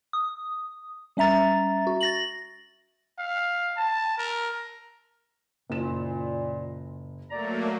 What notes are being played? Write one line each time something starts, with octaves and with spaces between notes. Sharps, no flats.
D#6
G3 C#4 E5 A#5 A6
F#4
A6 A#6 F#7
F5
A5
A#4
F#1 A#2 E7
F#3 A3 A#3 D5 A#5